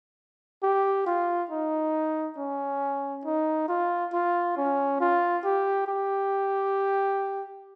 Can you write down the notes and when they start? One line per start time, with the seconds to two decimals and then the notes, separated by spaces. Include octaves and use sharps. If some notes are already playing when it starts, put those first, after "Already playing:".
0.63 G4
1.06 F4
1.51 D#4
2.38 C#4
3.25 D#4
3.69 F4
4.13 F4
4.57 C#4
5.01 F4
5.45 G4
5.87 G4